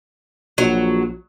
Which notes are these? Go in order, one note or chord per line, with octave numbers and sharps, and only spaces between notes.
A#1 F#3